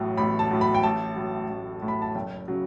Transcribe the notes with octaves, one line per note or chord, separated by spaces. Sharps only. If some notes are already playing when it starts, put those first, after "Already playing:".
Already playing: A1 A2 F#3
A1 B5
A5
A2 F#3
B5
G5
A1 A5
A2 F#3
A1
A2 F#3
B5
A5
F#1 G5
C#3 F#3